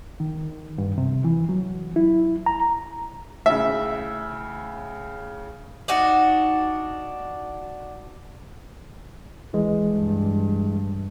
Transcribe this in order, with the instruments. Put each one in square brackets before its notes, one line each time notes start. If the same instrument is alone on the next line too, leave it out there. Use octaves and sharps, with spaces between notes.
[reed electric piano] D#3
G2
C3
E3
F#3
E4
A#5
[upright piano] A2 C#3 [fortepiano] E5
[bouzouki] D4 D#4 F#4
[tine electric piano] C#2 E3 G#3
[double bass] G2